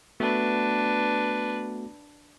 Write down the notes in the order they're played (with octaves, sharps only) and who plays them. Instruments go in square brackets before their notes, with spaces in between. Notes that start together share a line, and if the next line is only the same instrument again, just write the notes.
[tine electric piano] A3 B3 F#4 [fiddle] D4 B4